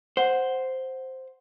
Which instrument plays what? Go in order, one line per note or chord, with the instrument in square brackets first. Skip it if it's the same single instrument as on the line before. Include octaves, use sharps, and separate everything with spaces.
[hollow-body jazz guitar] C5 [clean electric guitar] F#5